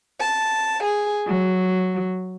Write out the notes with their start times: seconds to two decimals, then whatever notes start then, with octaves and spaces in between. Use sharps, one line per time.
0.21 A5
0.83 G#4
1.26 F#3